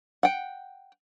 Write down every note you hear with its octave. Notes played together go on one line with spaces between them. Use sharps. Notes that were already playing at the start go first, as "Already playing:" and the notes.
F#5 G5